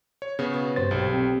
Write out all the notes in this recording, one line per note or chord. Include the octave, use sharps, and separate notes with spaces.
C#5
C#3 B3 C#5
B2
G2 C3 C5 A6
B1 G3 A4
C4